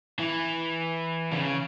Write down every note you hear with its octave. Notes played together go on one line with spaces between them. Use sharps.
E3
C#3